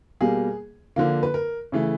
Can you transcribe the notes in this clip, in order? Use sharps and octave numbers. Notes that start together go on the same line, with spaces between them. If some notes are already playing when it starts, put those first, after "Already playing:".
B2 G3 A#3 G#4
D3 F3 A#3
B4
A#4
C#3 E3 A3